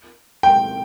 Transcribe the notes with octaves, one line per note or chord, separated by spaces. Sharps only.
G5